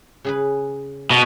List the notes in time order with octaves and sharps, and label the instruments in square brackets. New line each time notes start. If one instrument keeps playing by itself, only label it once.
[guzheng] C#3 G#4 B4
[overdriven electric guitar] B2